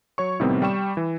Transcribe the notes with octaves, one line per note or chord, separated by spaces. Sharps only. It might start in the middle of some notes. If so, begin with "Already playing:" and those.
F#3 C#5 C#6
A2 C3 D#3 G3 B3 C4
G3 G5 C#6 E7
E3